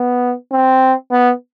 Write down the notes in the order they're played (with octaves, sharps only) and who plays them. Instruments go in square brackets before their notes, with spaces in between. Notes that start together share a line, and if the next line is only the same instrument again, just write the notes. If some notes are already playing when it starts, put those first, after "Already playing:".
Already playing: [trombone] B3
C4
B3